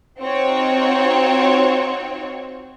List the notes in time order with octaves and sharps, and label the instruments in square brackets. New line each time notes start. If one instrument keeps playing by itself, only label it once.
[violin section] C4 D#4 F4 F#4 C#5